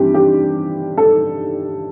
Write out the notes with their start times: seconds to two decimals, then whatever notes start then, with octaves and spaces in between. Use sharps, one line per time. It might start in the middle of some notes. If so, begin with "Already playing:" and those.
Already playing: G2 E3 C4 G4
0.14 G4
0.97 A4